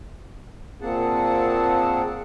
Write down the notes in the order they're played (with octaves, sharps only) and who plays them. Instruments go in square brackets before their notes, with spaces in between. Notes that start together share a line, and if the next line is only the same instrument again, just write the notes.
[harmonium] A#2 A#3 C4 G#4 F#5 A5